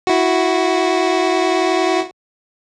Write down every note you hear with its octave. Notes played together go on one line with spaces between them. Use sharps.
E4 F#4